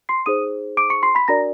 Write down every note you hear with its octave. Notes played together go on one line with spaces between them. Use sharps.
C6 C7
D#4 G#4 C5 D#6 D#7
D6 D7
C#6 C#7
C6 C7
B5 B6
D4 F#4 A#4 D5 A#5 A#6